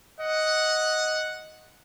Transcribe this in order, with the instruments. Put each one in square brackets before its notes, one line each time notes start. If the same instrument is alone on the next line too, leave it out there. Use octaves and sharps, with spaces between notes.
[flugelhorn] D#5 [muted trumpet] F#5